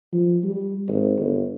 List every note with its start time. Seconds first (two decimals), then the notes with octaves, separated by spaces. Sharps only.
0.13 F3
0.44 G3
0.88 G#1
1.19 G1